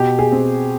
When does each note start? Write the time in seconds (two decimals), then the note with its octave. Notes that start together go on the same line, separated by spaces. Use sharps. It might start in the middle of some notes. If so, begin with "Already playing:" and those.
Already playing: B2 G4
0.19 G#4
0.32 C4